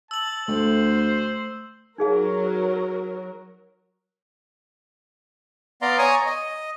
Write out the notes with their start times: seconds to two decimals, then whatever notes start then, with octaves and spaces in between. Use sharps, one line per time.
0.11 A5 E6 F#7
0.48 D2 A3 C5
1.98 F#3 D#4 G#4 A#4 F5
5.82 B3 D5 F5 A#5 C6
5.98 C#5 G#5 A#5 C#6 D#6
6.26 D#5